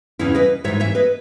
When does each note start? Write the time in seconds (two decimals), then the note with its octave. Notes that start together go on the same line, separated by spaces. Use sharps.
0.19 E2 C#3 E3 C#4 E4
0.35 B4 D#5
0.64 G#2 C#5 E5
0.67 E3
0.80 C#5 E5
0.95 B4 D#5